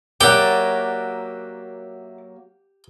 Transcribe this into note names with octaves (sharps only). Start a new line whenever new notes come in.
F#3 A#3 G4 D5 E5 F#5